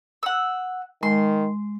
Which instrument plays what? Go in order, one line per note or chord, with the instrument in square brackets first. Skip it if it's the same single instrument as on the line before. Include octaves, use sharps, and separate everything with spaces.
[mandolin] F#5 E6
[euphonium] D#3 [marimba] G#3 [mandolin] C6